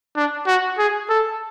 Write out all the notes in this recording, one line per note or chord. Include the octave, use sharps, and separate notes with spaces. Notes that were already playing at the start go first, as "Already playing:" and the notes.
D4
F#4
G#4
A4